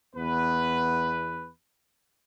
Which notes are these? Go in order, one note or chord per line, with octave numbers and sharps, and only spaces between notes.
E2 B3 B4